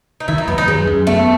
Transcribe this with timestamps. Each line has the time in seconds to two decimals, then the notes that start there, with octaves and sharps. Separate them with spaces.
0.20 D#4
0.28 D#3 E4
0.38 D#4
0.48 F#2 B3
0.58 D#4
0.68 F#2 G#3
0.87 F#2
1.07 A3 B3